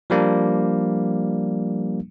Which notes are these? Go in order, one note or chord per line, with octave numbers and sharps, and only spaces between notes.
F3 G3 A#3 D4